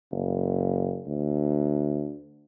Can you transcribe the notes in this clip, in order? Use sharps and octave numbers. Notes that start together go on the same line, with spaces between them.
F#1
D2